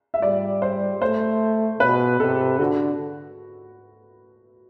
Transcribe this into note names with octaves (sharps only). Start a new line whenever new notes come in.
E5
G3 D5
C5
A3 C5
B2 B4
C3 A4
D3 F#4